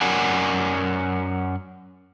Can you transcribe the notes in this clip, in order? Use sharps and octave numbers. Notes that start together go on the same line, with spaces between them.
F#2 C#4 A#4 D5 F#5 G#5